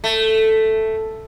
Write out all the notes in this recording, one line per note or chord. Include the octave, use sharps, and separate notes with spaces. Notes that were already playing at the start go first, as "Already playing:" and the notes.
A3